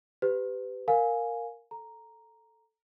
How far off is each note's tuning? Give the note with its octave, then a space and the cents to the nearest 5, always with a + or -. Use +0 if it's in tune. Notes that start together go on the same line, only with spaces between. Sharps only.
G4 +0 B4 +30
A#4 -5 F5 +15 G#5 +0
A4 +0 A#5 +0